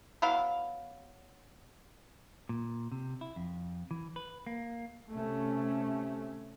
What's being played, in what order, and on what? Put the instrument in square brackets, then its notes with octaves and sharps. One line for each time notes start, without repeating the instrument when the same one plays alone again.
[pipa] F#3 B3 E4 F5
[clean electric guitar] A#2
C3
E4
F2
E3
B4
A#3
[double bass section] C3 A3 C#4